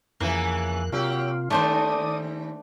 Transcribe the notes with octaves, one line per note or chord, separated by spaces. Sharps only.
F2 C#3 E3 A#3 B3 F#6
C3 F#3 F4 G4
D#2 A3 D4 C5 D5 G5 D#6